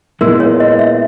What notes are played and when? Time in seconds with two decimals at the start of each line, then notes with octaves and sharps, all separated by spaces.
0.21 A#2 G#3 B3 E4 A#4
0.40 C#5
0.60 D#5
0.79 E5